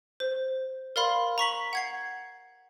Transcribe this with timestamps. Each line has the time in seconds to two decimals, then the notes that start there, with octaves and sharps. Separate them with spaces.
0.20 C5
0.96 A#4 D5 F5 B5 C6
1.38 A#5 C#6 B6 F#7
1.73 F#5 G#6 C7